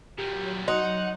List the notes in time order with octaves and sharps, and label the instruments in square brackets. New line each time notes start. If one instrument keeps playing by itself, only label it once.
[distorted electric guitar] A#2 G3 [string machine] F#3 [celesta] G4
[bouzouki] D#4 [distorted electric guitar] F#5 [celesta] C6 F#6